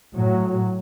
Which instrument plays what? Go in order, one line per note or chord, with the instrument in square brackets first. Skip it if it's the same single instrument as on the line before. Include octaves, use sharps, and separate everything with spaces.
[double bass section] A2 F#3